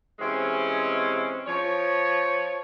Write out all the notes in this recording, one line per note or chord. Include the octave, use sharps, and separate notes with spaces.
C3 E3 G#3 C4 C#4
F3 C#5